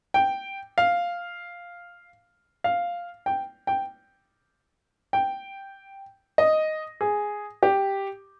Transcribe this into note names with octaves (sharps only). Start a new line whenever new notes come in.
G5
F5
F5
G5
G5
G5
D#5
G#4
G4